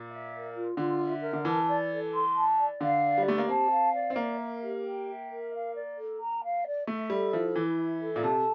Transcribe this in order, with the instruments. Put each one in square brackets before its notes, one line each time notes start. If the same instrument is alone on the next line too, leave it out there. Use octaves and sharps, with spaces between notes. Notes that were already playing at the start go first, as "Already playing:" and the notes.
Already playing: [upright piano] A#2
[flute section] E5
A#4
F4
[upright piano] D3 [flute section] F4
[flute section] E5
A#4
[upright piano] D3
[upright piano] E3 [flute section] A5
[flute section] D5
A4
C6
A5
D5
[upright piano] D3 [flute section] F5
[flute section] D5
[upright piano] G3
[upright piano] A3 [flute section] G4
[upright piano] A#3
[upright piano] C4 [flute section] A5
[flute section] F5
D5
[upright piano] C4
[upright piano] A#3 [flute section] E5
[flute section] A#4
G4
G5
E5
A#4
F5
D5
A4
A#5
F5
D5
[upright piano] A3 [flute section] E5
[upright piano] G3 [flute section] A4
[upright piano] F3 [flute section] E4
[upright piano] E3 [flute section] E4
[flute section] E5
A4
[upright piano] A#2
[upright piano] C3 [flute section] A5